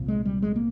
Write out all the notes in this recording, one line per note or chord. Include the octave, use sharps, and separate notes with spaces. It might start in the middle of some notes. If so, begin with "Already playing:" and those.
Already playing: C2 A#2
G#3
G3
G#3
A#3